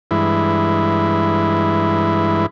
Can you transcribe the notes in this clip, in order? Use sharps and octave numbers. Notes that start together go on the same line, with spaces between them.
G2 E3 G#3 E4